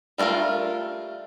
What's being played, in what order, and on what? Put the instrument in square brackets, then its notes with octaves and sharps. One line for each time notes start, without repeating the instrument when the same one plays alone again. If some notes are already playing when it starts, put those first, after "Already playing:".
[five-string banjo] G3 A3 C#4 F4 A#4